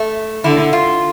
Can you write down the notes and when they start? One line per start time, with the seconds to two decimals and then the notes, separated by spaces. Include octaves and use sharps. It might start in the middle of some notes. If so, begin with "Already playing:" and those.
Already playing: A3
0.44 D3 E4
0.73 F4